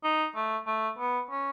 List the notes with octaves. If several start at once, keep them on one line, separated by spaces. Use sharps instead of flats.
D#4
A3
A3
B3
C#4